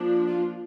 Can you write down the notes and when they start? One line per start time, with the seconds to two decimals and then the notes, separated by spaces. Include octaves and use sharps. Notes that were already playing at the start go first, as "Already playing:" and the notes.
Already playing: F3 A#3 D4
0.26 F4